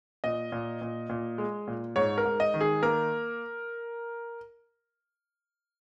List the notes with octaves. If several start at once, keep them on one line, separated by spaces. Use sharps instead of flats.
A#2 D#5
A#2
A#2
A#2
G#3
A#2
G#2 C#5
A#4
G#2
D#5
D#3
G#4
A#3 A#4